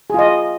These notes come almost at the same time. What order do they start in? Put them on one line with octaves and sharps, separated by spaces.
G#4 F4 D#5